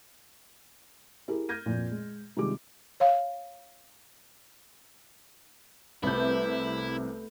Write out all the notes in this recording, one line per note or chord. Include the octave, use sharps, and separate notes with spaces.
E4 G4 G#4 A#4
F6 G6 G#6 A#6 D#7
F2 A#2
G#3
C3 D#3 G3 G#3 F4 D6
C#5 F5
C2 C3 A3 B3 E4 G6